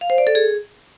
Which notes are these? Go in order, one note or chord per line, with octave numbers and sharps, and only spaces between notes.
F5
C5
D5
A4
G#4